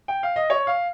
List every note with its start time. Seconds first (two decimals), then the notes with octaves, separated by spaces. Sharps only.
0.08 G5
0.23 F5
0.36 D#5
0.50 C#5
0.67 F5